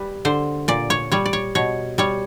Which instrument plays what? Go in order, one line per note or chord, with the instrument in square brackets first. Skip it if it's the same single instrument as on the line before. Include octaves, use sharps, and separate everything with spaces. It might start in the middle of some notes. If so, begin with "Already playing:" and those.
Already playing: [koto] G3 B4
D3 C5
A#2 D5
C#5
G3 C#5
D5
C#5
B2 C#5
G3 C#5